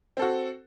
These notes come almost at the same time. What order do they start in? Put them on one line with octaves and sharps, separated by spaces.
C4 A4 F#4